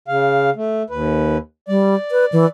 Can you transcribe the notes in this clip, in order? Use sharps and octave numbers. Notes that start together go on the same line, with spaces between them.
C#3 F5
A3
D#2 B4
G3 D5
B4
E3